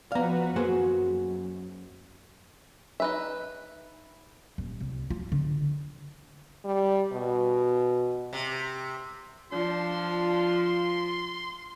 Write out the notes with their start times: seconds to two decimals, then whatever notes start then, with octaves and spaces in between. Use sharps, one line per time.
0.12 F3 B3 F#4 B4 D5 F5 A#5
0.56 F#2 A#3 F#4 G#4 B4 C5
3.00 D#4 B4 E5
4.58 D#1
4.80 C2
5.10 F4
5.32 D3
6.65 G3
7.13 B2
8.33 C3
9.52 F3 D4 F4 C6